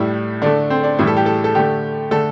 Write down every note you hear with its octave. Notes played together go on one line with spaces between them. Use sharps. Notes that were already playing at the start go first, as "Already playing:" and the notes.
Already playing: A2 G3 E4
D3 A3 D4
C4
D4
A2 E3 G3 E4
A4
G4
A4
A4
D3 A3 G4
D3 A3 A4